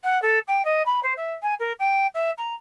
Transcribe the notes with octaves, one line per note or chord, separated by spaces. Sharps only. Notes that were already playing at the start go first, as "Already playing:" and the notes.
F#5
A4
G5
D#5
B5
C5
E5
G#5
A#4
G5
E5
A#5